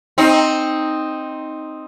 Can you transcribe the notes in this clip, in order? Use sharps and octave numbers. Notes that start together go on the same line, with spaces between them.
C4 D#4